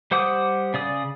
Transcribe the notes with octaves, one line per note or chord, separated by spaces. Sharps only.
G3 C5 F#5 D6 D#6
C#3 D5 D#6